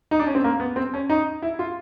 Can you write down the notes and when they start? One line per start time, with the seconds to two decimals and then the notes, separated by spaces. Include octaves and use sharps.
0.11 D#4
0.19 D4
0.27 C#4
0.35 C4
0.44 A#3
0.60 B3
0.76 C4
0.94 C#4
1.10 D#4
1.42 E4
1.59 F4